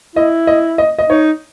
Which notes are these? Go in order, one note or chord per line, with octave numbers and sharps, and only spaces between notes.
E4 D#5
D#5
D#5
D#5
D#4 C#5